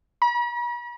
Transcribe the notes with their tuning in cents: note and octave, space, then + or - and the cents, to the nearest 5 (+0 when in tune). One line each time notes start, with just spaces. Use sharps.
B5 -45